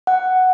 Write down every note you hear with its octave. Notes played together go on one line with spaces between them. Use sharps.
F#5